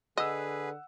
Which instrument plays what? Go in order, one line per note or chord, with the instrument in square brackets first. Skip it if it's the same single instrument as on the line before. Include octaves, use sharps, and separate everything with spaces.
[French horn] D3 [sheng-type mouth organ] G#4 B4 [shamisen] D#5 [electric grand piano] F#5 E6